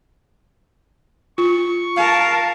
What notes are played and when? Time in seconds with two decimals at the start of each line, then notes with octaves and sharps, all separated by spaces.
1.38 F4 C#6
1.97 A#4 F5 A5